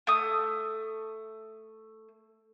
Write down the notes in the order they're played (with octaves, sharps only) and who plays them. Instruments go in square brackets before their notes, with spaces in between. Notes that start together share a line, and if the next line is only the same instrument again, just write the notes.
[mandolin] A3 D#6